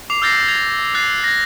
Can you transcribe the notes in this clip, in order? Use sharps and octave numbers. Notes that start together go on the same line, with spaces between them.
D6 C7 F7
E6 F6 G6 A6 A#6 C7
G#6 A#6 F7
E6 F#6 A6 C7
G#6 A#6